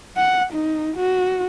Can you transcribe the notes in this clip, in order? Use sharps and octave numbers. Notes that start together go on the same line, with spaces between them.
F#5
D#4
F#4